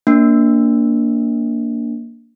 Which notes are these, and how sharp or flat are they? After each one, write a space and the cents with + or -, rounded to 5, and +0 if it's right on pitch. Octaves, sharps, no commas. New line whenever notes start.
A#3 +0 D4 -15